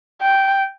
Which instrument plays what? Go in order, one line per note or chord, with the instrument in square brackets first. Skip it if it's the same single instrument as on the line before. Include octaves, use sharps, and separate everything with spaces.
[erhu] G5